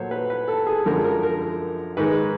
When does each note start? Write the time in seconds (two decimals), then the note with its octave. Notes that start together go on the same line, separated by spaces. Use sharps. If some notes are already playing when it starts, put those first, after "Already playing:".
Already playing: A#2 F#3 A3 C5 C#5
0.11 B4
0.30 B4
0.48 A4
0.67 G#4
0.86 F#2 D3 F3 G#3 A#4
1.04 A#4
1.23 A#4
1.97 G#2 D#3 G#3 B4